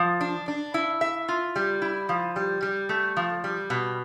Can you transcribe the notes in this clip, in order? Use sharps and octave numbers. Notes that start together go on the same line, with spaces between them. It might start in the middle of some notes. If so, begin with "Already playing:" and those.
Already playing: F3
D4
D4
E4
E5
F4
G3
E4
F3
G3
G3
A3
F3
G3
B2